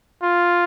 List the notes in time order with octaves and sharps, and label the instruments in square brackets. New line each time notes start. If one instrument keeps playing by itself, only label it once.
[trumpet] F4